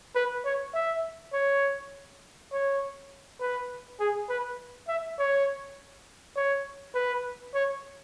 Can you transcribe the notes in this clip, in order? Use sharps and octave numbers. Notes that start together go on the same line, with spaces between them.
B4
C#5
E5
C#5
C#5
B4
G#4
B4
E5
C#5
C#5
B4
C#5